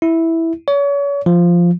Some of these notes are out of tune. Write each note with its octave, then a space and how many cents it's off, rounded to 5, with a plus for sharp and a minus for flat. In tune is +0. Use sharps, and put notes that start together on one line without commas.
E4 -5
C#5 +35
F3 -5